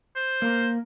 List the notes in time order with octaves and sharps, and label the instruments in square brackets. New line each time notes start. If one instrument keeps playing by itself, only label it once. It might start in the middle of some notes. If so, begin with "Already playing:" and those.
[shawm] C5
[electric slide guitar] A#3 A#4